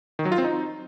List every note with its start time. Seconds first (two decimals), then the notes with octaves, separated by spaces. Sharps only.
0.19 D#3
0.25 F#3
0.32 F4
0.38 C4
0.44 D#4